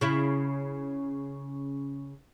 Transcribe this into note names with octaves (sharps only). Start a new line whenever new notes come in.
C#3 E4